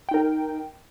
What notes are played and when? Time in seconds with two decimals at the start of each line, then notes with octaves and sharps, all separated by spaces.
0.09 G5
0.11 D#4
0.14 A#4